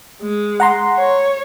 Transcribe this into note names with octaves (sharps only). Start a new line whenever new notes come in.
G#3
F#5 A#5 C6
C#5